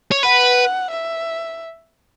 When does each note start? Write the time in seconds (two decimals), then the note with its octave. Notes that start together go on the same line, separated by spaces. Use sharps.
0.12 C#5
0.23 B4 F#5
0.91 E5